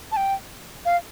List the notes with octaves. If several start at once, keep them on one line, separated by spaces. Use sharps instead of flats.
A5
G5
F5